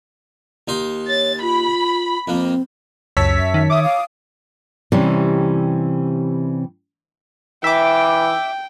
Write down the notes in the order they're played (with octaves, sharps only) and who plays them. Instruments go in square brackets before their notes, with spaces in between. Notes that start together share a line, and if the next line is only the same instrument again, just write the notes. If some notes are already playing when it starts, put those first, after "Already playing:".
[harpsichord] D#2 D#4 C6
[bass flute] C#5 [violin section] A6
[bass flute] F4 [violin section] B5
[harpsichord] F2 A#3 [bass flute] C4
[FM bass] C#2 [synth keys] F#2 B6 [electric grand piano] C#5 A5 E6
[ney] E5
[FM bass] D#3
[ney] E5 [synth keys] D6 D#6
[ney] F5
[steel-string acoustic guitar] C3 E3 G3 C4 C#4
[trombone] E3 [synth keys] E5 D6 [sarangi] G5